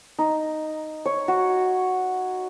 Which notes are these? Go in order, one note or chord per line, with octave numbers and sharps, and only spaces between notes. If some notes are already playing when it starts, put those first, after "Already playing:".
D#4
C#5
F#4